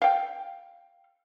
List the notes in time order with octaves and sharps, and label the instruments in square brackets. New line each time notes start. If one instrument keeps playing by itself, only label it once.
[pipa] F5 G5